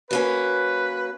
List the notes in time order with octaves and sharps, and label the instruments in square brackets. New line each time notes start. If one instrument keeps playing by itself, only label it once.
[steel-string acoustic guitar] F#3 A#3 C#4 [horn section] B4